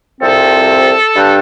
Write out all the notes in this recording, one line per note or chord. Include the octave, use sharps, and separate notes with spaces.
C2 C3 F3 C4 A4
G2 G3 D4